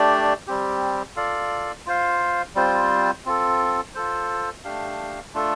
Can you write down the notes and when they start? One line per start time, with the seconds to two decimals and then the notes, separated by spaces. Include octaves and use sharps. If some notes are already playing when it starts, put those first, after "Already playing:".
Already playing: A3 D4 G4 D5
0.47 G3 C4 G4
1.16 F4 A4 D5 F5
1.86 F4 C5 F5
2.55 G3 C4 F4 C5
3.25 C4 F4 A4
3.95 F4 A4 C5
4.64 A3 D4 G4 F5
5.34 A3 D4 F4 A4